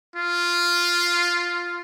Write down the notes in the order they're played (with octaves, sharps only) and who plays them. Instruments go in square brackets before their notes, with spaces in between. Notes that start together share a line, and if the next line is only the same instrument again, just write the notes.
[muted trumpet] F4